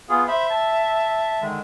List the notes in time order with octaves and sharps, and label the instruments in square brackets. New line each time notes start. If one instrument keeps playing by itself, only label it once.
[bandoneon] B3 F4 G#4
[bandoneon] C5 B5 [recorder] E5
[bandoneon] A5
D3 D#3 G#3